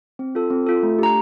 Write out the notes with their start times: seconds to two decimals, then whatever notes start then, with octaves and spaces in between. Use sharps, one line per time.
0.19 C4
0.35 F4 A4
0.50 C4
0.66 F4 A4
0.83 A3
0.99 D4 G4 A#5